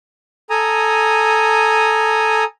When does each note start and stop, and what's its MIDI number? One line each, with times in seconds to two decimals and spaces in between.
0.50 2.44 69
0.50 2.44 80
0.50 2.44 82
0.50 2.44 87